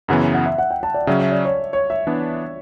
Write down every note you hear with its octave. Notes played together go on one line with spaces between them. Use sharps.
F#2 C#3 E3 B3 F#5
E5
F#5
E5
F#5
G5
A5
D5
C#3 F#3 C#4 E5
E5
D5
C#5
C#5
E5
E3 B3 D4